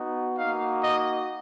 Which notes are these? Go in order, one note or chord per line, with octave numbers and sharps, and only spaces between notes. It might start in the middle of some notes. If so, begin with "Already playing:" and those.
Already playing: B3 D#4 F#4
A#3 D#4 F#4 F5
D#5